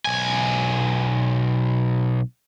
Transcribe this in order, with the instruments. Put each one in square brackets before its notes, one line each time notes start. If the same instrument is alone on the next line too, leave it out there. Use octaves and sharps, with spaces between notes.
[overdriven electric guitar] B1 G#5